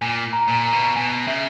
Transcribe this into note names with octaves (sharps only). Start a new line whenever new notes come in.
A#2 G#5
A#5
A#2
A#5
B2
B2 G#5
C#3 E5